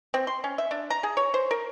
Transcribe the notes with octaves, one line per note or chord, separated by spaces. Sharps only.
C4
C6
C#4
E5
D4
A#5
G#4
C#5
C5
A#4